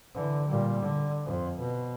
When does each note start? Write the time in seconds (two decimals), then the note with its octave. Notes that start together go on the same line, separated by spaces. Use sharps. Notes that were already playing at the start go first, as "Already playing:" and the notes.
0.15 D3 E3
0.47 A#2 G3
0.83 D3
1.25 F2
1.60 B2